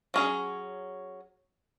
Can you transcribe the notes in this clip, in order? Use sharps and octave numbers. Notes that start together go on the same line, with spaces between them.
F#3 C#4 G#4